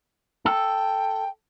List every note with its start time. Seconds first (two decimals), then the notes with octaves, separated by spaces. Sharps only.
0.46 A4 G5